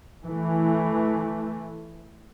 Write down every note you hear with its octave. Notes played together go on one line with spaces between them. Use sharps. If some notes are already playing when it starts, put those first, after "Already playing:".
E3 A3